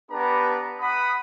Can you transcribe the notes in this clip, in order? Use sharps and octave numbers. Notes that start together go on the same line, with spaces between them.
B3 D4 G4 B4 A#5
F#5 B5 D#6